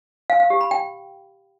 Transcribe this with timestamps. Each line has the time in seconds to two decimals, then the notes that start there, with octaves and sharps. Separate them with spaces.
0.30 F5
0.40 F5
0.50 G4
0.61 B5
0.71 G5